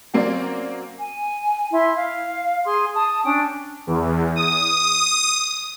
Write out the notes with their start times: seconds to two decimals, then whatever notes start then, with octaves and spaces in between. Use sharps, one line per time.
0.14 F#3 A#3 C4 C#4 D5
0.98 G#5
1.72 E4 E5 C6
1.96 F5
2.65 G#4 C6
2.95 A5 D#6
3.24 C#4 D4 G5
3.87 E2
4.36 D#6